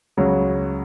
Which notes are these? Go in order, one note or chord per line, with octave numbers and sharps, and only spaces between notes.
C#2 C#3 F#3